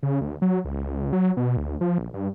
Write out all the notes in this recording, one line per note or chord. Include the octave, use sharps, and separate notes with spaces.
C#3
D2
F#3
C#2
C#2
F#3
B2
D2
F3
A#1
G2